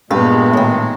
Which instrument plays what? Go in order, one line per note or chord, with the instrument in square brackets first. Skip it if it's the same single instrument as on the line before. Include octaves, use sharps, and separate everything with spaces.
[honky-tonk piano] G2 [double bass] A#2 B3 [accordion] G#3 [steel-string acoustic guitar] G4 B4
[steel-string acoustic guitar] A2 D#3